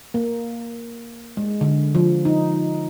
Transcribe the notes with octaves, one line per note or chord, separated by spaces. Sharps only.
A#3
G#3
D3
F3
D#4